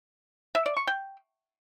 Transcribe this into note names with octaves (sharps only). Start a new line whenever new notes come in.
E5
D5
C#6
G5